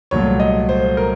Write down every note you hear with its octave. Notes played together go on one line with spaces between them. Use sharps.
C2 A#2 F#3 A3 C#5
D#5
C5
A#4